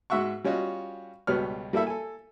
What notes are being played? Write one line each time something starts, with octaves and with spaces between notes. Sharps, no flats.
G#2 F#4 E5 F#5 C#6
G3 C#4 F4 F#4 D#5
C#2 B2 G3 B4 C#5 F6
G3 A#3 E4 A4 E5
A4 G#5